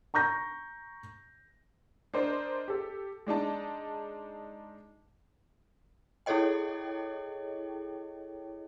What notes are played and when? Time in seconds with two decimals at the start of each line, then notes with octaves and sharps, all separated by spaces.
0.14 A#5 C#6 G6 A#6
2.14 D4 A#4 C5 D#5
2.68 G4 A4
3.27 G#3 D4 D#4 A5
6.26 E4 G#4 A4 C#5 D#5 G5